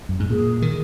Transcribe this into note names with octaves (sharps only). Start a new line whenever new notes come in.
F#2
G#2
A#2 G#4
D#3